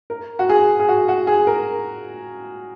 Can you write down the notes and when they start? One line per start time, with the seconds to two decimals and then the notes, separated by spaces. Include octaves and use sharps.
0.10 A#4
0.39 F#4
0.49 G#4
0.80 G#4
0.88 F#4
1.08 F#4
1.27 G#4
1.47 A#4